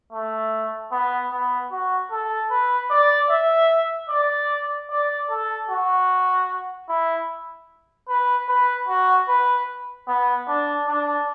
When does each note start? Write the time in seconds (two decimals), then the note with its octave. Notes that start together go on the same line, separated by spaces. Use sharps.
0.12 A3
0.92 B3
1.31 B3
1.71 F#4
2.11 A4
2.50 B4
2.90 D5
3.30 E5
4.09 D5
4.90 D5
5.30 A4
5.70 F#4
6.89 E4
8.09 B4
8.48 B4
8.88 F#4
9.28 B4
10.08 B3
10.48 D4
10.88 D4